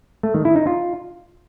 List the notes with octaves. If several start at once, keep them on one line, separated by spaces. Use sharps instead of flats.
A3
D#3
E4
D#4
F4